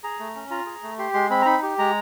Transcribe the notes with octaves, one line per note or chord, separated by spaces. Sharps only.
G#4 A#5
A3
C#4
F4 A#5
G#4
A3
G4 C6
G#3 C6
C4 B5
A#5
D#4 B5
G4
G#3 A#5